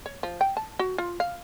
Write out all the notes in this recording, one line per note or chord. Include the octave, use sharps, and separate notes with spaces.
C#5
F3
G5
A5
F#4
F4
F5